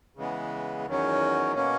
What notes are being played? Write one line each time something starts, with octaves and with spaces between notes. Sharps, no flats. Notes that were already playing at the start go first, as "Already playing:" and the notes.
C#3 E3 G#3 B3
E2 D#3 F#3 C#4
B2 A#3 C#4